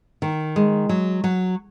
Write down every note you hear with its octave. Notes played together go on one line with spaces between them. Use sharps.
D#3
G#3
F#3
F#3